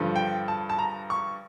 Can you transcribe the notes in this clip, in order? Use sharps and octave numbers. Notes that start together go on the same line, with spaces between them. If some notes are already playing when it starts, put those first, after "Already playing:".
Already playing: G2 D3 F3
G5
A5
A5
A#5
C#6